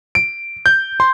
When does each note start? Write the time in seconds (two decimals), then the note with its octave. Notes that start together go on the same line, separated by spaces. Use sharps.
0.15 D7
0.66 G6
1.00 C6